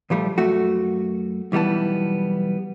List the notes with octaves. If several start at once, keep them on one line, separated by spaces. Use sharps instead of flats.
A#2 F3 G3 A3
F#2 A3 F#4
B1 E3 G3 B3 A5